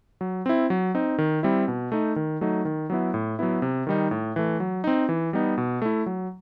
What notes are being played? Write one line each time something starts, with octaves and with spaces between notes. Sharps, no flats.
F#3
C4 E4
F#3
C4 D#4
D#3
G3 C4 E4
B2
A3 D#4
D#3
F#3 A3 D#4
D#3
F#3 B3 E4
A2
F#3 B3 E4
C3
D#3 G3 D#4
A2
E3 A3
F#3
C4 D#4
E3
G3 B3 D#4
B2
A3 E4
F#3